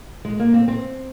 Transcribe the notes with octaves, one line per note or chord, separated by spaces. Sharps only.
G#3
A#3
C4
C4